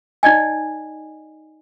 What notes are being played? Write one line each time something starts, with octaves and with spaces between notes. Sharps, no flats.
D#4 D5 D#5 G#5